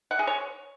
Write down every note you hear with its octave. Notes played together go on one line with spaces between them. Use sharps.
F#5
G#4
C#5